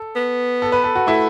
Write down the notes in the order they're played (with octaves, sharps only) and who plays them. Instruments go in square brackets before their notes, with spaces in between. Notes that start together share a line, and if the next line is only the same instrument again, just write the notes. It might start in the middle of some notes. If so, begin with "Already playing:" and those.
Already playing: [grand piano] A4
[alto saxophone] B3
[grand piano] A4
B4
A4
F#4
[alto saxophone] A3 [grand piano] E4